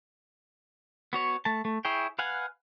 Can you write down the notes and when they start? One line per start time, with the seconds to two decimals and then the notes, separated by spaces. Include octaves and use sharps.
1.13 B3 F#4 C#5
1.45 A3 A5
1.65 A3
1.85 E4 G#4 C#5 G5
2.19 B4 F5 F#5 G#5